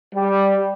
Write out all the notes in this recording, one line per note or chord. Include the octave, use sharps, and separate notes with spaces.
G3